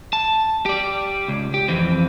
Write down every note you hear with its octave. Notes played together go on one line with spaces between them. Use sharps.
A5
G4 D5
C#2
G4
F2 E3 C4